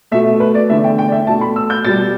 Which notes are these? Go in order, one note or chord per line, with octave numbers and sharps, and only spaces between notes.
B2 A3 E5
B4
D5
E2 D3 A3 E5
G5
G5
D5
E5
B2 A3 A5
B5
E6
G6
B2 G3 A6